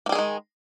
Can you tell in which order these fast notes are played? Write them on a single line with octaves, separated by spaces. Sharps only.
A#3 G3 G#4 D#3 G#3